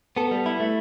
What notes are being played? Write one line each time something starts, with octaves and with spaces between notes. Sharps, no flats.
B3 A4
G3
E4
A3